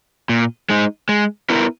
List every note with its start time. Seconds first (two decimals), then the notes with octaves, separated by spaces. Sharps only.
0.29 A#2
0.70 G#3 D#4
1.09 G#3
1.49 B3 E4 A#4